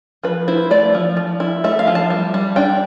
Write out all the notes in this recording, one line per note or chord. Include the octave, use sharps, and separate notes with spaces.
F3 B4
E4 C5
A3 D5
F3
F3
E4
A3 E5
F5
F3
A5
G3
G3
D4 G5